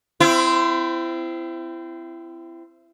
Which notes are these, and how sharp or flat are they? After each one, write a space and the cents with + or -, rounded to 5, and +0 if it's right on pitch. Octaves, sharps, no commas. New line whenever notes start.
C4 -15 E4 +30